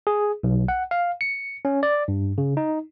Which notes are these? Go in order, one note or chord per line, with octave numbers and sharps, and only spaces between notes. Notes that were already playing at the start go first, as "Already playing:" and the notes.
G#4
B1
F#5
F5
C#7
C#4
D5
G2
C#3
D#4